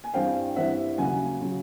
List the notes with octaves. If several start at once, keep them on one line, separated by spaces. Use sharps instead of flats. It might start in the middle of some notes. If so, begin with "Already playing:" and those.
G#5
G2 E3 G3 C4 F5 G5
G2 E3 G3 C4 E5 F#5
D#2 C#3 F#3 F#5 G#5
C#3 F#3